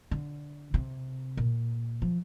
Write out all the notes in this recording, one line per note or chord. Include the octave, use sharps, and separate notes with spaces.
D3
C3
A#2
F3